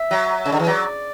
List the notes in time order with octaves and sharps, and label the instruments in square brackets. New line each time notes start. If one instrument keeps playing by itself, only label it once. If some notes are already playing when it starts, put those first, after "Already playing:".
Already playing: [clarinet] E5
[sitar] F#3
C#3
D3
E3
[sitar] F#3 [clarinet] D5